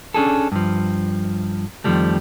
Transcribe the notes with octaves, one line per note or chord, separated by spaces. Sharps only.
C#4 D4 G#4 A4
G2 F3
F2 A2 D#3 F3 G3 A3